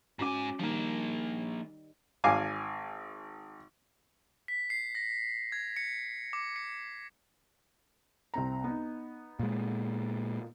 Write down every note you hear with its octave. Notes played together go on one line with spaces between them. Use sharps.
G#2 C#4 F#4 G#5 D6
D#3 F3 G3 A#3
G#1 F5 G#5 D6
B6
C7
A#6
G#6
C#7
D6
C#7
C2 C4 A#5
B3 D#4
A#2 G#3